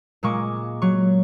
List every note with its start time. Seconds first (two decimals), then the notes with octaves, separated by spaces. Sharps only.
0.23 A#2 G#3 A#3 C#6 D6
0.82 F#3 C#6